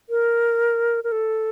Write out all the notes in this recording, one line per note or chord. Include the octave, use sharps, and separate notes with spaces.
A#4
A#4
A4